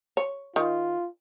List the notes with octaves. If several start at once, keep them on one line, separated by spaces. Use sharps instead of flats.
C#5
D#3 F4